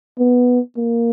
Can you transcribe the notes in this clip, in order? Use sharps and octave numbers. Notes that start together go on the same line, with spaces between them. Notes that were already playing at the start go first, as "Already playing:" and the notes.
B3
A#3